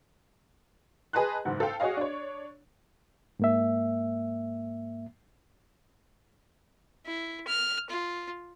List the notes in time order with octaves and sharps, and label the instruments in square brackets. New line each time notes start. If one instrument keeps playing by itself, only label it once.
[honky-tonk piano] G#4 B4 D#5 A5 C6 F#6
F#1 G#2
A4 F5 G5
F#4 G#4 C#5 D#5 F5
D4 C#5
[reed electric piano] G#2 A#3 E5
[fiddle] E4
F6
F4